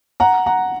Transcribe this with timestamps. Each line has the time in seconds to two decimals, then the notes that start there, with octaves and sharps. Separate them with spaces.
0.20 F#5 A#5
0.46 F#5 A#5